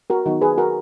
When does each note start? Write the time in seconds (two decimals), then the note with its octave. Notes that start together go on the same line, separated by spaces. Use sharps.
0.10 F#4 A#4
0.26 D#3 F#3 B3 D#4 F#4
0.41 G#4 B4
0.58 F#4 A#4